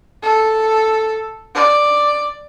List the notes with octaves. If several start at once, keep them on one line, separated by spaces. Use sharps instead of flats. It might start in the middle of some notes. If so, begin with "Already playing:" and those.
A4
D5